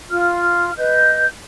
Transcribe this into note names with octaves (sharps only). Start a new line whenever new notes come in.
F4 F6
B4 D#5 G6